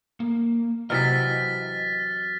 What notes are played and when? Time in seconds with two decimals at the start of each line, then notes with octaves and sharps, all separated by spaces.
0.20 A#3
0.90 C3 E3 F#3 D#5 F6 A6 B6